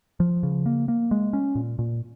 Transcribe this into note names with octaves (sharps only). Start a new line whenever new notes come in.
F3
C#3
A#3
A#3
G#3
C#4
A#2
A#2